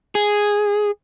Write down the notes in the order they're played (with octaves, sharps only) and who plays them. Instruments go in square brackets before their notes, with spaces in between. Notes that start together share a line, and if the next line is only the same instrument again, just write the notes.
[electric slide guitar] G#4